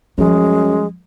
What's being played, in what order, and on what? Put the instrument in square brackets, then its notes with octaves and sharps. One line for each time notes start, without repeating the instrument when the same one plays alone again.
[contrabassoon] F#2 [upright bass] F3 G3 [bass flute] G#3